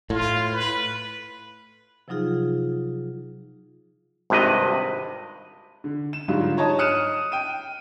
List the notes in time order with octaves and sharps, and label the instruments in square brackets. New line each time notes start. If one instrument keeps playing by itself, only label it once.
[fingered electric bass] A2 [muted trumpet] F4
[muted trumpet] B4
[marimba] C3 F3 F#3 D#4 F4 G#4
[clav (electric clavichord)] G#1 G2 C3 B4 D#5
[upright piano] D3
E7
G#2 D3 F#3 G3 F4
D#4 C#5 D#5 A5
D#6 F6 F#6 C#7 D#7 E7
G5 D#7